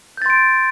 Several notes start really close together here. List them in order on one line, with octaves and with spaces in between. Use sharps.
G6 A6 C6 D7